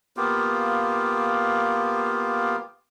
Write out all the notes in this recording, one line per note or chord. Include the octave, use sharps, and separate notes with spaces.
A#3 B3 F4 G4